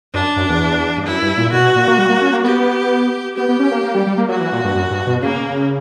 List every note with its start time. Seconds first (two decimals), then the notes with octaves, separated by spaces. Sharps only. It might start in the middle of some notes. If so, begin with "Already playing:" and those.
0.14 F#2 D4
0.36 F#2
0.49 E2
0.97 G2
1.06 F#2 E4
1.22 G2
1.37 A#2
1.52 B2 F#4
1.75 A#2
1.88 A#3
1.98 G3
2.10 A#3
2.21 C#4
2.33 A#3
2.44 B3 G4
3.37 B3 G4
3.48 B3
3.60 C#4
3.71 A#3
3.83 A#3
3.95 G3
4.06 G3
4.18 A#3
4.29 F#3 F#4
4.40 E3
4.52 A#2
4.64 G2
4.75 F#2
4.91 G2
5.07 B2
5.22 C#3 A#3